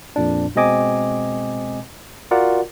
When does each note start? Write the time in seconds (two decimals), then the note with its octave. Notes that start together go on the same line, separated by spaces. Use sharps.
0.16 F2 A#2 D4
0.55 B2 G#3 C4 D#5 G#5 D6
2.31 F4 F#4 A#4 D5 F#5